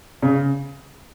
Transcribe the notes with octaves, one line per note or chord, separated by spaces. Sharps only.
C#3